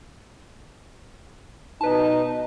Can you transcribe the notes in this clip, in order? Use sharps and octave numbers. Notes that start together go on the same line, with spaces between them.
B2 D#4 B4 A5